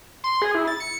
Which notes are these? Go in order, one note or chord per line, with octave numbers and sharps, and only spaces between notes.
C6
G#4
E4
A6
C#7